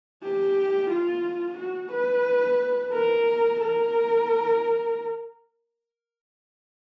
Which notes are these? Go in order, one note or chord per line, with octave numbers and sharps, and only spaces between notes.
G4
F4
F#4
B4
A#4
A#4